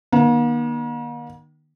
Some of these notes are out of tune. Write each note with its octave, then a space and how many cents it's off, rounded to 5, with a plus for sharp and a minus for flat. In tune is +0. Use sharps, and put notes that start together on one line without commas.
D#3 -30 A#3 +45